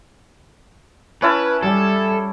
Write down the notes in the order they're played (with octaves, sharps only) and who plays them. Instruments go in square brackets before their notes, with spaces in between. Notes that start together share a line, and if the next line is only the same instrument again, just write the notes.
[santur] C#4 E4 A5 [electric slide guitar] B4
[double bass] G3 [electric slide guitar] A4